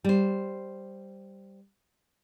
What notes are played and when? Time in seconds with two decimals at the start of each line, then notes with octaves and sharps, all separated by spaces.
0.04 G3 C5